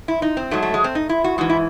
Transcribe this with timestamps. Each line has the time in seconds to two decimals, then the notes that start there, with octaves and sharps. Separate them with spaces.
0.08 E4
0.22 D#4
0.37 C4
0.51 G#2 F#3 A3
0.62 A3
0.74 G#3
0.84 C4
0.95 D#4
1.09 E4
1.24 F#4
1.38 G#2 E3 F#4
1.50 E4